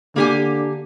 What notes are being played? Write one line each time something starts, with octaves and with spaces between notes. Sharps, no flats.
D3 A#3 G4 G#5